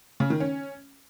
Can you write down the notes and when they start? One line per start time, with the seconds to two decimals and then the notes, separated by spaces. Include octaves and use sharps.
0.20 C#3
0.30 D#3
0.40 C#4